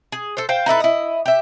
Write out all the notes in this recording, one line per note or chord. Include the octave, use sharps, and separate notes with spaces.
G#4
A4 C5
C5 F5 G5
D#4 E4 A4 B4
E4 D#5
G4 E5